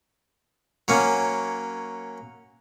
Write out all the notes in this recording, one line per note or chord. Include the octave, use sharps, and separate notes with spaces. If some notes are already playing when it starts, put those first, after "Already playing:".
F#3 A#3 C#4